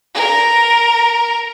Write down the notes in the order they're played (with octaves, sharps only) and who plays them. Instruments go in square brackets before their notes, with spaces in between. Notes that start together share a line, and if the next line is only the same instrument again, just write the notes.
[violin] A#4